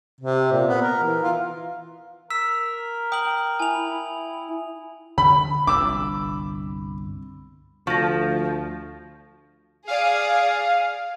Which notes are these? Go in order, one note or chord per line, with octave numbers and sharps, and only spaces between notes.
C3
A#2
B3
A#4
E3
F4
A#4 E6 B6
G5 D#6 F#7
E4 G#5 F7
D3 B5
G1 C2 D4 D6 E6
D2 F3 C#6 A#6
G#4 D5 F5